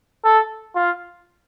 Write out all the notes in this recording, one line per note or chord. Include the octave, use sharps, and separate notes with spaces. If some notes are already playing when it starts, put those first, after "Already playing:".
A4
F4